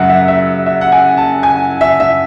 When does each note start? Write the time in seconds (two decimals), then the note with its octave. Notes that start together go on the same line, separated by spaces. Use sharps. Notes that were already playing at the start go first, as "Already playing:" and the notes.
Already playing: F#2 C#3 F#3 F#5
0.09 E5
0.28 E5
0.66 E5
0.81 F#5
0.92 G#5
1.17 A5
1.43 G#5
1.81 E5
2.00 E5